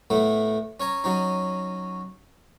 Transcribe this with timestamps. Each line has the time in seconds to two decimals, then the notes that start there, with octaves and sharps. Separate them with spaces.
0.10 A2 A3 B3
0.80 C#4 C#5 A#5
1.04 F#3 C#4 D#4